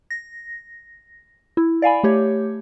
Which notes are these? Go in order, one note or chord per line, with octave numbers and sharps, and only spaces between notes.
A#6
E4
D5 F5 G#5 B5
A3 G4 C#5